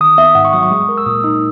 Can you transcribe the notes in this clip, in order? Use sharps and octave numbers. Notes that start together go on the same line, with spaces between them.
D#3 D#6
B3 E5
G#2 F#5
C#6
F#3 D#6
C#6
G#3
A#4
E6
A#2 D#6
D#4 E6